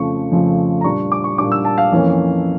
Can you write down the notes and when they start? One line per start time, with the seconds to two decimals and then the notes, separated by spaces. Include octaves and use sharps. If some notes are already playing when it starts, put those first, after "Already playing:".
Already playing: F2 C#3 F3 A3 C#6
0.31 F2 C#3 F3 A3
0.81 A#5
0.84 A#2 G3 D4 C#6
1.12 D6
1.24 C#6
1.38 A#2 G3 D4 D6
1.52 E6
1.65 A5
1.78 F5
1.92 F2 E3 A#3 C#4